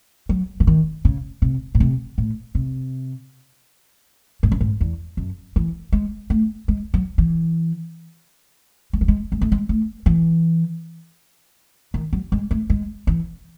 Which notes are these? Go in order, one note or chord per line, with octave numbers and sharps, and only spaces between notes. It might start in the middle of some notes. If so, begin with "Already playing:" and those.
F#3
E3
D#3
C#3
C3
A2
C3
A2
C3
G#2
F#2
G#2
E2
F#2
E3
G#3
A3
G#3
F#3
E3
G#3
F#3
G#3
G#3
A3
G#3
A3
E3
D#3
F#3
G#3
A3
G#3
E3